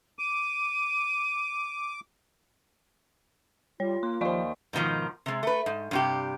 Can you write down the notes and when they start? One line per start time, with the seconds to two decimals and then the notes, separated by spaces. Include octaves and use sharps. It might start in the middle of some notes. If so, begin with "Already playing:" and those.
0.19 D6 D#7
3.80 G3 F4 C#5
4.03 A#3 C6
4.21 D#2 F3 C5 D5 F5 C#6
4.73 G#2 B2 D#3 F3
5.26 C3 G#3
5.43 A3 B4
5.66 G#2
5.91 G2 C3 G4